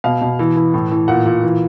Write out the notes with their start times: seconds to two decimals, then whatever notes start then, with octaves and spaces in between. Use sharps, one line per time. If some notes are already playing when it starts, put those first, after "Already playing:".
0.04 B2 F5
0.21 B2
0.39 E3
0.56 E3
0.74 A2
0.91 E3
1.08 A#2 F#5
1.26 A#2
1.43 E3